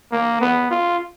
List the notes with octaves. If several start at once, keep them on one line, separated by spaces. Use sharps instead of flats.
A#3
B3
F4